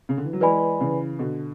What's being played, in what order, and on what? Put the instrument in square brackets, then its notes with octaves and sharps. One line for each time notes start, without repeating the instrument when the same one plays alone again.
[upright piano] C#3
D3
E3
F#3
[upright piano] E3 G#3 [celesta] B4 D5 G#5 B5
[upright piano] C#3 E3
B2 D3